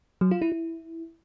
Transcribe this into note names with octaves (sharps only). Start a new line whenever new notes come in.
F#3
F4
E4
E4